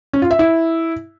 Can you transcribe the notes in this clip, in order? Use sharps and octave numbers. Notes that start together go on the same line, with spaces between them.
C#4
F4
E5
E4